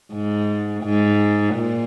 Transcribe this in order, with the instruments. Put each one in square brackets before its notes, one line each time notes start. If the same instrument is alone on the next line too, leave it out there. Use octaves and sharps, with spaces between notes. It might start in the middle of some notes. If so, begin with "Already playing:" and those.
[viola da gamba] G#2
G#2
A#2